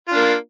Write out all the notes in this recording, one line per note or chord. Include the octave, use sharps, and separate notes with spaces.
A#3 D4 F4